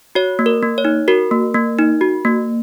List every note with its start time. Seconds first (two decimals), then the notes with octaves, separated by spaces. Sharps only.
0.15 F#4 C#5
0.39 A#3
0.46 A#4
0.63 A#3
0.78 C#5
0.85 D#4
1.08 F#4 A#4
1.31 A#3
1.54 A#3
1.79 D#4
2.01 F#4
2.25 A#3